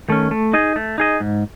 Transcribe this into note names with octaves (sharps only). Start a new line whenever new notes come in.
D#3 A3 C#4
A3
D#4 G#4 D#5
A3
D#4 G#4 D#5
G#2